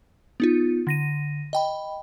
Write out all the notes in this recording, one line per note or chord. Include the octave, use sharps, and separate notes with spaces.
B3 D#4 F4
D3 A#6 D#7
D#5 G5 B5